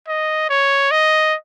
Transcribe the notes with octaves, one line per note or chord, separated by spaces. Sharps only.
D#5
C#5
D#5